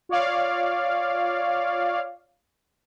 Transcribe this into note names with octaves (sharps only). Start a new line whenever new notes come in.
F4 C#5 D5 F5